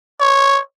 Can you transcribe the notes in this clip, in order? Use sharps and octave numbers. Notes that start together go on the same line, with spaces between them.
C#5